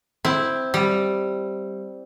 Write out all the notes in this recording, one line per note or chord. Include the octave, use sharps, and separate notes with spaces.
C4 E4
G3